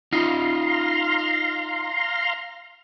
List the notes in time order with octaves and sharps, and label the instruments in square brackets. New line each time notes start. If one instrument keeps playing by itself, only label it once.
[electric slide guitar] D#4 F4 [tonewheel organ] F5 A#5 C6